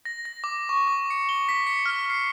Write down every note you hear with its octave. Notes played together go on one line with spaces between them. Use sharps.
A#6
A#6
D6
C#6
D6
C#7
G7
B6
C#7
F6
C7